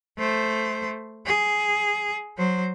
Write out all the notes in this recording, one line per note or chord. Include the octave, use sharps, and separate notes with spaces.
A3 C5
G#4
F#3 C5